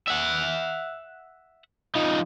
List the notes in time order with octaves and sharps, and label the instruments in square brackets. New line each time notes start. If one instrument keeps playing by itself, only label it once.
[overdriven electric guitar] E5 F#5
F3 D#4